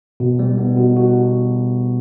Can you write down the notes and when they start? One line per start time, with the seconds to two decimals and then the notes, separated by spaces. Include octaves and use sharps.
0.20 B2
0.39 G3
0.58 B3
0.77 B2
0.96 F#4